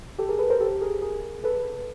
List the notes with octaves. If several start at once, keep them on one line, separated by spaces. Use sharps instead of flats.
G4 A4
G#4 A#4
A4 B4
A#4 C5
G4 A4
G#4 A#4
G#4 A#4
A4 B4